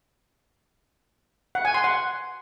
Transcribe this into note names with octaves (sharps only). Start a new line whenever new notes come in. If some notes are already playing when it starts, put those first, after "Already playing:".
F#5
G#5
C6
F#5